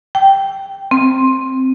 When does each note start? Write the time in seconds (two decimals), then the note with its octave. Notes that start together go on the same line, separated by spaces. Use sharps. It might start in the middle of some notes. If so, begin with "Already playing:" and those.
0.15 G5
0.91 C4